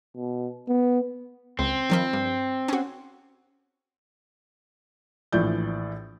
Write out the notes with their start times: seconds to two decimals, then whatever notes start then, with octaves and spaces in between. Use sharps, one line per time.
0.17 B2
0.68 B3
1.59 C#2 C4
1.90 D#3 F3 B5
2.13 G2
2.68 C#4 F#4
5.32 A#1 A2 E3 F3 D5 G6